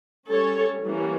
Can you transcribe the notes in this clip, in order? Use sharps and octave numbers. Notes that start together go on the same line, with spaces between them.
G3 C#4 A4 C#5
E3 G3 A#3 C#4